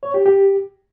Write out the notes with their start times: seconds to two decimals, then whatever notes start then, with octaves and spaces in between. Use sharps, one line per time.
0.03 C#5
0.14 G4
0.26 G4